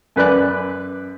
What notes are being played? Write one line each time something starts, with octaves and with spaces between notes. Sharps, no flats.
F#2 B4 D5 F#6